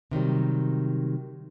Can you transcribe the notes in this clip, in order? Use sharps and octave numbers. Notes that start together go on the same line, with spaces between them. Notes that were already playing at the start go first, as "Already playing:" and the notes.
C3 D#3 F#3 G3